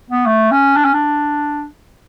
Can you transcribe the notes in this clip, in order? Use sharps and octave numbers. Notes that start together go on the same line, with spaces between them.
B3
A3
C#4
D4
C#4
D4